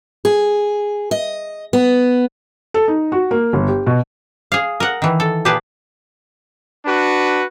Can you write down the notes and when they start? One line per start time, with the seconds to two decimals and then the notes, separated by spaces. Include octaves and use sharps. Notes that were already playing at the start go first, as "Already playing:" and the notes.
0.25 G#4
1.11 D#5
1.73 B3
2.74 A4
2.88 D#4
3.12 F#4
3.31 A#3
3.53 G1
3.68 G4
3.87 B2
4.52 G#4 F5
4.80 A#4 F#5
5.02 D#3 E3
5.20 A4
5.45 A#2 G4 G#4 B4 A5
6.86 D4 F#4 B4